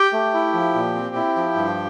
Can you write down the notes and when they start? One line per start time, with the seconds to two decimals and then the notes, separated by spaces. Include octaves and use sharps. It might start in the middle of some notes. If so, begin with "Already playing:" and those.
Already playing: G4 G5
0.13 A3
0.34 E4
0.54 F3
0.75 A#2
0.95 C4
1.16 E4
1.36 F3
1.56 G2